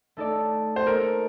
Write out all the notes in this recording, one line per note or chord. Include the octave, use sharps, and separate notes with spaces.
A3 D#4 A4 D5
C5
A#3 F#4 A4 A#4 D#5